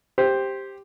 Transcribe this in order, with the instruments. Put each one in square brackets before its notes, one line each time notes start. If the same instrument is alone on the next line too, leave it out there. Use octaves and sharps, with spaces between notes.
[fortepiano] G4 C5